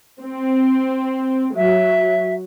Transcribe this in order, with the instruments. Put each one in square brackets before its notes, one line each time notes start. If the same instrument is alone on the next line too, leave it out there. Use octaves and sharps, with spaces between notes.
[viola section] C4
[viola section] F#3 [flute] E5